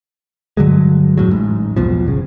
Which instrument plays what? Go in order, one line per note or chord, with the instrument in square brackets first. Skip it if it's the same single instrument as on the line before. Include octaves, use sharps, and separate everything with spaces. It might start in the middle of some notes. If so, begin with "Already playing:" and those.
[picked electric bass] G2 D3 F#3 G#3
E2 A2 F#3
A1 G#2
B1 E2 B2 F3
G1 C#3